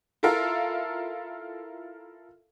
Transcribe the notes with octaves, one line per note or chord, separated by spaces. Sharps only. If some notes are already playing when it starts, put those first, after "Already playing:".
E4 F4 A4 A#4 E5 F5